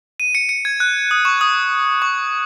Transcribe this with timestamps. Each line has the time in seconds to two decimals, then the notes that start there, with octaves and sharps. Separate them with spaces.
0.20 D#7
0.35 C#7
0.49 C#7
0.65 G#6
0.80 F#6
1.11 D#6
1.25 C#6
1.41 D#6
2.02 C#6